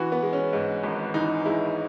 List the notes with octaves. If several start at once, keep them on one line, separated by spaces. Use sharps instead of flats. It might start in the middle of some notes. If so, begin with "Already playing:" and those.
Already playing: E3 F#4
B3
G#3
C#4
G#2
G#1
E3 D#4
G#3 E4